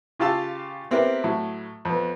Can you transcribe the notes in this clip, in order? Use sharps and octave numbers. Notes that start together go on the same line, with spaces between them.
C#3 F4 G4 F5 A5 E6
B3 C4 E4 G4 A#4 B4
A2 F#3
F2 B3